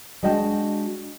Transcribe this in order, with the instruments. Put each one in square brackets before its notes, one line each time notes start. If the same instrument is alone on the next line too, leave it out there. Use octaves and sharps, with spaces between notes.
[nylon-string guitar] G#3 D4 F#4 D#5 G5 A5